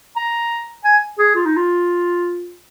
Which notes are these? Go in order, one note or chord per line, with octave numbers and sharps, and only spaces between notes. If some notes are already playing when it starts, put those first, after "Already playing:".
A#5
G#5
G#4
F4
D#4
F4